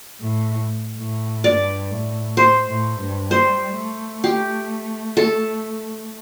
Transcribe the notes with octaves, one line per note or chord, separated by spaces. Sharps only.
A2
A2
G2 D5
A2
C5
A2
G2
G3 C5
A3
G4
A4